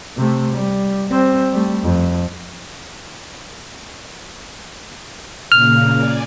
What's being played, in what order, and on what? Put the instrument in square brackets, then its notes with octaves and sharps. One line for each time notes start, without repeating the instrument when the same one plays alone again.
[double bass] C3 A3
G3
G3 C4
G3 A3
F2
[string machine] A#2 C#3 A#3 [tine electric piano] F6
[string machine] D5 G#5